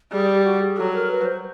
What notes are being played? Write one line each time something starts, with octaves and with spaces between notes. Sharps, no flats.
G3 G#4
G4
F#4
G#4
F#3 A4
A#4
B4
C5